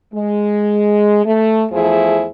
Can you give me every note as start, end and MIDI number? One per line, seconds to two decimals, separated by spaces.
0.14 1.22 56
1.26 1.64 57
1.72 2.27 40
1.72 2.27 53
1.72 2.27 57
1.72 2.27 64
1.72 2.27 68
1.72 2.27 72